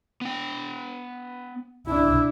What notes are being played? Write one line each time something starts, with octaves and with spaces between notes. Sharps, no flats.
B3 G5
D4 E4